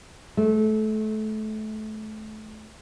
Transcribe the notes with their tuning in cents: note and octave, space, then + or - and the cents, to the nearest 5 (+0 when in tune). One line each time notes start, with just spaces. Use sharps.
A3 -25